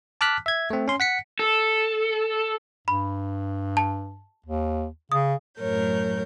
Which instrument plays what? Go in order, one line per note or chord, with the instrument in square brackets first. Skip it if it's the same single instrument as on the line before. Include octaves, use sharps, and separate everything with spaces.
[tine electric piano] A5 D6 F6 F#6 B6
E5 G#6
A3 C4
C#4 C6
F#5 B6 C#7
[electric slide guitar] A4
[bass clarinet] G2 [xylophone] B5
[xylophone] A5
[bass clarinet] D#2
[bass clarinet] C#3 [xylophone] D#6
[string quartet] F#2 A2 F#3 A#4 C#5 G6